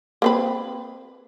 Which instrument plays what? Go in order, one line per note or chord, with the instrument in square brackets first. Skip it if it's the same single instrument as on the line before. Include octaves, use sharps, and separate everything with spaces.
[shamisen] A#3 C4 B4